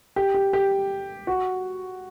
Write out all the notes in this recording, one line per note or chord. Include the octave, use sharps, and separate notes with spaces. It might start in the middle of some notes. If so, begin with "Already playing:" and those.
G4
G4
G4
F#4